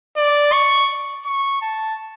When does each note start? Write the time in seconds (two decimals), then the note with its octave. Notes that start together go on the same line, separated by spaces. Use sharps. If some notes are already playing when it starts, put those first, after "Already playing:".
0.17 D5
0.53 C#6
1.26 C#6
1.62 A5